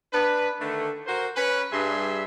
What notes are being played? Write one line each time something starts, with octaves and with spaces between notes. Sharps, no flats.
D4 B4
D3 D#3 A3
F#4 A#4 C5
C#4 B4
G2 G3 G#4 E5 C6